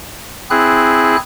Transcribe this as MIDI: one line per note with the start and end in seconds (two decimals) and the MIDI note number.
0.50 1.17 60
0.50 1.17 64
0.50 1.17 68
0.50 1.17 90